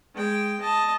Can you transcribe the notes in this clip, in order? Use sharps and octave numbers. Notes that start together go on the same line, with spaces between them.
G#3 G5
D#5 A5